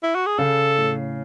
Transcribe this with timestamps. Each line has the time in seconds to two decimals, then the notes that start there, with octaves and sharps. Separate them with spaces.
0.03 E4
0.15 F#4
0.26 G#4
0.39 C#3 A4
0.78 A2